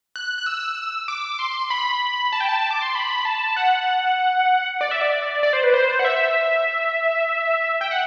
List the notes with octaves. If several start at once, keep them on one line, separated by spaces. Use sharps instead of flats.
F#6
F#6
E6
D6
C6
B5
A5
G5
A5
D6
C6
B5
A5
F#5
D5
E5
D5
D5
C5
B4
C5
F#5
E5
G5
F#5